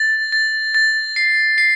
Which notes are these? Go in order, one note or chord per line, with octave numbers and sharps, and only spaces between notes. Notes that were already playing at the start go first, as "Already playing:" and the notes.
Already playing: A6
A6
A6
C7
C7